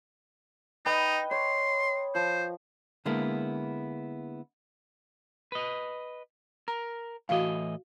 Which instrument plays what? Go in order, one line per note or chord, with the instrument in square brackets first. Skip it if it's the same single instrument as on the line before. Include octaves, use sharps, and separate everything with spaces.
[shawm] D#4 [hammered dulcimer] B4 D#5 G5
[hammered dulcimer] C#5 [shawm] C6
[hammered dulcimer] F3 [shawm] C5
[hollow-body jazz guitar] D3 G#3 A#3 B3 E4
[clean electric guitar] B4 D#5
[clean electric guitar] A#4 [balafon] A#5
[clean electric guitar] A2 E3 D#5 [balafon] F#4 F5